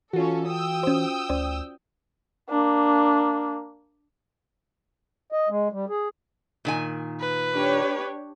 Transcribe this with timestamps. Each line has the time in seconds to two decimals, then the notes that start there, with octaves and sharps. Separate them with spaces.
0.13 E3 C#4 F4 F#4 A4
0.48 G5 D#6 E6
0.83 C#4 C5
1.29 D2 C#4 C5 D5
2.49 A#3 D4
5.32 D#5
5.49 G#3
5.72 G3
5.89 G#4
6.65 A#2 D#3 G#5
7.21 B4
7.54 D4 G4 C#5